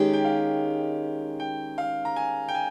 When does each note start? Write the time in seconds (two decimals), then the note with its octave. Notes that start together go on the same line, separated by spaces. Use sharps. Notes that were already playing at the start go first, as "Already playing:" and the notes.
Already playing: D#3 G#3 C#4 G4
0.13 G5
0.25 F5
1.40 G5
1.78 F5
2.05 A#5
2.16 G#5
2.48 G5
2.55 G#5